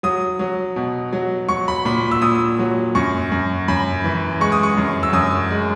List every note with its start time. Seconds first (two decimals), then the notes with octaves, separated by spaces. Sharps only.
0.03 F#3 D#6
0.39 F#3
0.76 B2
1.13 F#3
1.49 F#3 C#6
1.68 B5
1.85 A#2 B5
2.11 E6
2.22 A#2 D#6
2.59 F#3
2.95 F#2 C#6
3.32 F#2
3.68 F#2 B5
4.04 E3
4.41 G#3 C#6
4.52 D#6
4.63 C#6
4.77 F#2
5.03 E6
5.13 F#2 D#6
5.50 G#3